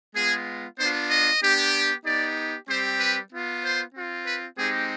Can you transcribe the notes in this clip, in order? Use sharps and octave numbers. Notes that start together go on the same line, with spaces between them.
G#3 B3 F4 G#4
B3 D4 F4 C5
D#5
B3 D4 G4
B3 D#4 G4 D5
G3 C4 G4 C5
B4
B3 F4
C5
C4 F4
B4
G#3 C4 D#4 G4 G#4